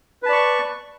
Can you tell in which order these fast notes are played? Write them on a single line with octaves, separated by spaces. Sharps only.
B4 A5 D5 C#6